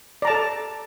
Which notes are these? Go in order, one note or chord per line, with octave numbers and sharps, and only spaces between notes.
A4 D5 A5 A#5